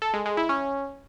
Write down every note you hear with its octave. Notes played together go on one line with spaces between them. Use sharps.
A4
G#3
G#3
E4
C#4